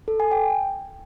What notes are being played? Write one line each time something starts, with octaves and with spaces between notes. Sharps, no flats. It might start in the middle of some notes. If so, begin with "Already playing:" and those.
A4
G#5
G5